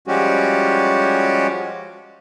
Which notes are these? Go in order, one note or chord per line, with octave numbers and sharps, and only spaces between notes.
F3 G3 G#3 C#4 F#4 G4